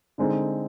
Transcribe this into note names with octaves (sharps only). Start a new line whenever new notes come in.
D3 G#3 C4 D#4